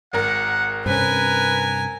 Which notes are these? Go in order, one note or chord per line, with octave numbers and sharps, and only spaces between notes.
G#1 A#4 F#5
G2 C3 C4 C#4 A#4 B4 G#5